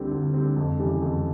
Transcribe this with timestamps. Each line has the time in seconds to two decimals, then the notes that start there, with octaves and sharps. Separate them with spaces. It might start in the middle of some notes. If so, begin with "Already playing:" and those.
Already playing: D2 D3 G3 C4
0.11 D2
0.34 D3 G3 C4
0.56 F2
0.78 C#3 E3 G3
1.01 F2